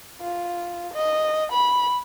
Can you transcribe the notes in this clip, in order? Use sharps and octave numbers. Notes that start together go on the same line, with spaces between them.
F4
D#5
B5